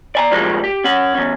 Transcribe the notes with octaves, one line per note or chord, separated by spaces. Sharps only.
D5 G#5 A#5
A#2 D#3 F3 G3 G#3 A#3
G4
C#4 F#5
E2 C#4